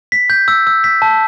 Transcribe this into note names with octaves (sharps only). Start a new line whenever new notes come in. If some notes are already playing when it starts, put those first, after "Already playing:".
B6
G6
E6
E6
B6
A5